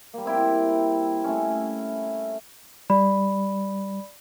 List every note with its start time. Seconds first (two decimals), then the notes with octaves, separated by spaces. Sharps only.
0.14 G3 A#3
0.26 C4 E4 G5
1.24 A3 C#4
2.90 G3 D5 B5